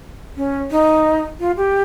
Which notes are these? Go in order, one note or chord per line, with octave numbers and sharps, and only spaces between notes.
C#4
D#4
F4
G4